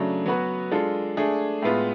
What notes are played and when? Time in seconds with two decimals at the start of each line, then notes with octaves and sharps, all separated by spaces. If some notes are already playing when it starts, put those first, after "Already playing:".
Already playing: C#3 F#3 A3 D4
0.26 F#3 B3 F#4 B4
0.71 G#3 D4 F4 A4
1.17 A3 D4 G#4
1.62 A2 G#3 B3 F4